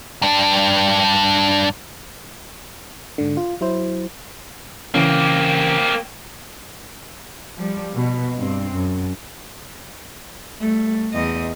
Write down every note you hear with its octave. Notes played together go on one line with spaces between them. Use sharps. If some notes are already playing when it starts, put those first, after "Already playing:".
G2 D4
G#2 D3
F4
F#3 E4 C5
C#3 E3 A#3 C4 C#4
F3 G3
B2
G2 C4
F#2
G3 A3
E2 D#5